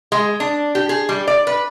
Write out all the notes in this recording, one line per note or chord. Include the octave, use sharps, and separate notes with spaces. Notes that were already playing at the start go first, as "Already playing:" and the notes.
G#3
D4
G4
G#4
G3
D5
B4